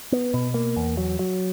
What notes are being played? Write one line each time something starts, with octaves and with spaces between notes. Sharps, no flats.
B3
B2
A#3
E2
F#3
F#3